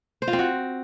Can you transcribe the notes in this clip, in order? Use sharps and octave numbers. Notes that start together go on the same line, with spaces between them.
C5
F4
C4
F#4